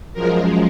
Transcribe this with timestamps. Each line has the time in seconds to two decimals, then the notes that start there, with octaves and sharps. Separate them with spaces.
0.13 F#2 F3 G#3 A#4